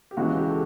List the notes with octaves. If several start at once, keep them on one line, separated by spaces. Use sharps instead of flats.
G4
C#2 C#3 E3 F#4
G4
A4